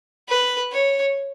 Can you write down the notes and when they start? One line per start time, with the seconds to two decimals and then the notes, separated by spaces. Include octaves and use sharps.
0.29 B4
0.72 C#5